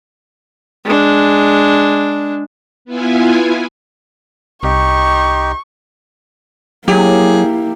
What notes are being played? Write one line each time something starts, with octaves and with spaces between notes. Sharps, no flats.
G#3 D4
B3 E4 F4 G#5
C2 D#4 G4 C#6
F#3 A#3 E4 G4 G#4